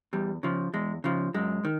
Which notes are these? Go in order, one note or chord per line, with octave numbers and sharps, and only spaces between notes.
E2 G3
C#3 F3
E2 G#3
C#3 F3
F#2 G#3
D#3